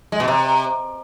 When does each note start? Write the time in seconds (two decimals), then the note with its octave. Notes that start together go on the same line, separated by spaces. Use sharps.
0.12 G#3
0.20 B2
0.28 C3